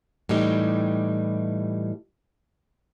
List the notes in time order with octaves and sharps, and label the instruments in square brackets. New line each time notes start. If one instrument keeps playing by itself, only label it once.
[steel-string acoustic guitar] A2 E3 G3 D#4 G4